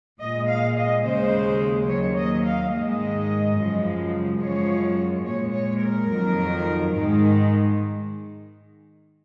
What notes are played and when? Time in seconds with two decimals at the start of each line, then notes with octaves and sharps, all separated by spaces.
0.20 A#2 G#3 D#5
0.49 F5
0.77 D#5
1.05 D#2 C#3 G#3 C5
1.88 D#2 D#3 F#3 C#5
2.17 D#5
2.45 F5
2.72 G#2 D#3 G#3 D#5
3.57 F#2 C#3 F3 G#3
4.41 F#2 F3 G#3 C#5
5.25 A#2 G#3 C#5
5.53 C#5
5.82 A#4
6.09 F2 D#3 F#3
6.94 G#2 D#3 G#3